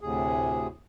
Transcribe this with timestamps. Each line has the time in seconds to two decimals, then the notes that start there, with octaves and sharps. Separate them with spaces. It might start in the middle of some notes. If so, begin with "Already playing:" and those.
0.01 D2 A2 C3 G#4